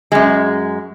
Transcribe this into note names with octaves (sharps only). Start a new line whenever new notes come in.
F#2 G#3